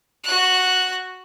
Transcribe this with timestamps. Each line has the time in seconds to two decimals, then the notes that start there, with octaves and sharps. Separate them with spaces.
0.24 F#4 F#6